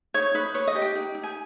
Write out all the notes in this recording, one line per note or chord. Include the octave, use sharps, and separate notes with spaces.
D#4 C#5
D#4 B4
B4 C#5
D#5
G4
G5
D#4
D#4
G#5